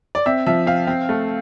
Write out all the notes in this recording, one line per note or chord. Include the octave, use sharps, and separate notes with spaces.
D5
C4 E5
F3 E5
C4 F5
C4
A3